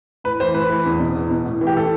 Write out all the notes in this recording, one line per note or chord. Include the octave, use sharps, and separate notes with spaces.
A2 B4
E3 C5
A2 B4
E3
E2
B2
E2
B2
A2
E3
G4
A2 A4